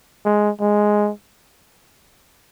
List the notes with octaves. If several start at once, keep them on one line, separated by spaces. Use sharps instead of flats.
G#3
G#3